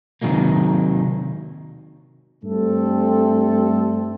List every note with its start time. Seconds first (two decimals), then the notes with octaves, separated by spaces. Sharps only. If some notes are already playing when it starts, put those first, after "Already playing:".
0.22 C3 D#3 F#3 G#3 A#3
2.44 G2 G3 A3 C4 A4